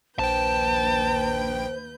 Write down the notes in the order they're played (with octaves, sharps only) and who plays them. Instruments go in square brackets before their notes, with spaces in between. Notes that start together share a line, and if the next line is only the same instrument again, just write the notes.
[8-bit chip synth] A#1 G5 [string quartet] D#2 B4 G6 [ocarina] C5 [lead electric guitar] A5